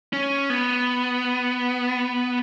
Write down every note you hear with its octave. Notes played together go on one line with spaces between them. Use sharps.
C#4
B3